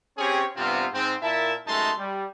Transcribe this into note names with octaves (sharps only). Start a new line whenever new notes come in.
C4 C#4 G4 G#4 C#5
G2 C3 B3 C4 F4
G#2 C4
A#2 E4 A#4 E5 A5
F#2 G#3 A3 D#4 A5 C6
G3